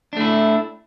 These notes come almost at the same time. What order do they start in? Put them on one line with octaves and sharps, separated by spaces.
D4 A3 E4